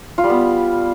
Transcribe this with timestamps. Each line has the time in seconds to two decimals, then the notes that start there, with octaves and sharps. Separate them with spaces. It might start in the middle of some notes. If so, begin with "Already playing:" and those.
0.18 F4
0.24 G3
0.30 B3